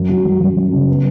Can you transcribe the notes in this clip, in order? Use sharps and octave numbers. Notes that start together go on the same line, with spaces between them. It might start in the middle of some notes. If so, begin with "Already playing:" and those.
Already playing: F#2
F#3
F#2
F#2
F#2
C#3
B3